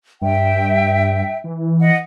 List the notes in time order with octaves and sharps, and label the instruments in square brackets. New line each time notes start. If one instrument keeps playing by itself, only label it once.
[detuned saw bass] G2 [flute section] E5 G5
[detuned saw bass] E3
[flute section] D#5 F#5